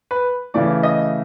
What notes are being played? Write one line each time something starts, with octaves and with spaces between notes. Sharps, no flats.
B4
C#3 E3 A3 D5
D#5